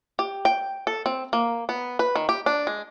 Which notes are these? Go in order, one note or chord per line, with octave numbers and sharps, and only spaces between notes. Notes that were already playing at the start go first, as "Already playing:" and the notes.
G4
G5
A4
C4
A#3
B3
B4
D#3
G4
D4
G#3